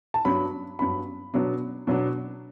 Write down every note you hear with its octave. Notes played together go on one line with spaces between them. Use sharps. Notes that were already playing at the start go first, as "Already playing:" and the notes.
A5
G2 F#3 B3 D4 B5
G2 F#3 B3 D4 B5
B2 F#3 B3 D4
B2 F#3 B3 D4